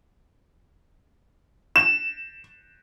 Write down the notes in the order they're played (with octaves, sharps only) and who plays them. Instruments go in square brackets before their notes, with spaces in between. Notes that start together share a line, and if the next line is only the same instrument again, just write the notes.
[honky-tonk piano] E7